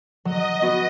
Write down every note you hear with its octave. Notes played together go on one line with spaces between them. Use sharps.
F#3 D#5
B3 F#4